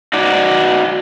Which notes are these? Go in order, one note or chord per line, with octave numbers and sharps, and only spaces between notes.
D#4 F#4 D5